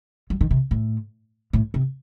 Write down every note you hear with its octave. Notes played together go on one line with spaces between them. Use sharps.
F#3
D#3
C3
A2
A2
C3